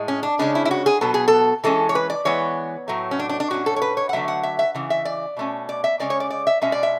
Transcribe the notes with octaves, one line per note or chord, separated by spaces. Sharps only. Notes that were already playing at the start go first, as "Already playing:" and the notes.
Already playing: A2 G#3
C#4
D4
C#3 G#3 C#4 D4
E4
E4
F#4
G#4
B2 F#3 B3 A4
G#4
A4
E3 G#3 C#4 A4
C#5
B4
D5
E3 G#3 B3 C#5
A2 F#3 A3
C#4
D4
D4
D4
A2 F#3 C#4 F#4
A4
C#5
B4
C#5
F#5
D3 F#3 A3 E5
F#5
E5
E5
C#3 E3
E5
D5
B2 A3 C#4
D5
E5
C#3 G#3 C#4 D5
C#5
D5
D5
E5
B2 G#3 C#4 E5
D5
E5